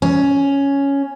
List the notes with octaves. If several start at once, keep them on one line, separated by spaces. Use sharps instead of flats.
C#4